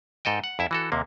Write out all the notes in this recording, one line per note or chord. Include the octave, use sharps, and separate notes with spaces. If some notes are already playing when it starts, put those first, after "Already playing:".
G#2 A4 D#5 G5
F#5
F2 E4 E5
E3 F#4 A4
D#2 C3 A#3